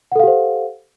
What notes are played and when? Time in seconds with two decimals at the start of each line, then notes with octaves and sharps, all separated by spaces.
0.12 F#5
0.16 A4
0.19 F5
0.23 G4
0.27 C5